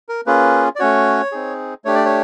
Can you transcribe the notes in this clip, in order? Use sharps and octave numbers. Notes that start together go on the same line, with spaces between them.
A#4
A#3 C#4 F4 G#4 B4
D5
A3 C#4 F#4 C#5
C4 D#4 G#4
A3 D4 G4 C#5
D5
C#5